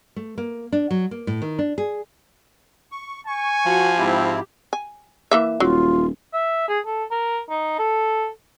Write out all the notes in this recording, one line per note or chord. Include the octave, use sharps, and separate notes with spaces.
A3
A#3
D4
F#3
A#3
A2
D#3
D4
G#4
C#6
G#5 C#6
F3 F#4
G#2 C4 E4 G4
G#5
E3 A#3 E5
D#1 F#3 F4
E5
G#4
A4
A#4
D#4
A4